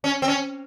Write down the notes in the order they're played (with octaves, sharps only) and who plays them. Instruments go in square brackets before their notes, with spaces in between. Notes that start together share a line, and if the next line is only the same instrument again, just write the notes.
[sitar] C#4
C4
C#4